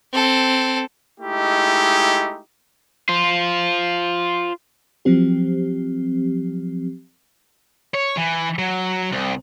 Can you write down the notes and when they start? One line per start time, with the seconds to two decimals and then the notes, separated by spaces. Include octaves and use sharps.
0.12 C4 A4
1.20 G#3 A3 D#4 E4 G4
3.09 F4 C5
5.05 F3 F#3 C4 G4
7.94 C#5
8.17 E3
8.59 F#3
9.12 C2